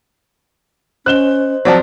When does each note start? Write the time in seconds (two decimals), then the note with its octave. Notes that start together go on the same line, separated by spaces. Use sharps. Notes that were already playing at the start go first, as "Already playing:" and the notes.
1.06 C#4 C5 D#5 F#6 E7 G7
1.65 F3 F#3 C4 D5 A5